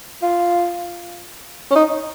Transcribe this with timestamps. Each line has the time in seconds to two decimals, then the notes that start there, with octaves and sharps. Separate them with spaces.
0.23 F4
1.71 C#4
1.76 D#4